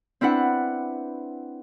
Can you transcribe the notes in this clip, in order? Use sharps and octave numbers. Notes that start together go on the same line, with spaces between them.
C4 D4 E4 B4 F#5